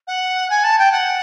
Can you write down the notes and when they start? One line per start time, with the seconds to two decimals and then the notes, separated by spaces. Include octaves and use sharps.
0.07 F#5
0.50 G#5
0.63 A5
0.78 G5
0.92 F#5